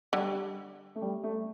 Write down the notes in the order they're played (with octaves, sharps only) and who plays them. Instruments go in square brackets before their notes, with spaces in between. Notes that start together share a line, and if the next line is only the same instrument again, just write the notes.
[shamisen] D3 [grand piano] G3
[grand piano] A3
G3
A3